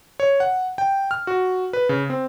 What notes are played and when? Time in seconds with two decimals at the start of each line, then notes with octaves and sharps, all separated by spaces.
0.20 C#5
0.40 F#5
0.78 G5
1.11 F6
1.27 F#4
1.73 B4
1.89 C#3
2.10 C4